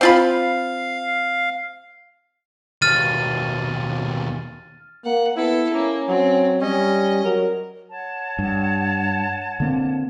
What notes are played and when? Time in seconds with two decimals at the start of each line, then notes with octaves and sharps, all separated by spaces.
0.01 C4 F4 F5 B5
2.82 D#2 B2 F6 A6 D#7
5.05 A#3 F#5
5.37 B3 E4 A4
5.74 A#3 C#4
6.09 F#3 C4
6.61 G3 C#4 D#5
7.25 F#3 A#4
7.91 C#5 F#5 A5
8.39 G2
9.60 D3 A#3 C4